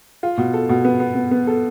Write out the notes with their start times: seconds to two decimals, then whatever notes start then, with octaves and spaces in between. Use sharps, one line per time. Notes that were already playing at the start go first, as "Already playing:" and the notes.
0.23 F4
0.38 B2
0.54 A4
0.69 B2
0.85 B3
1.00 B3
1.15 B3
1.31 B3
1.47 A4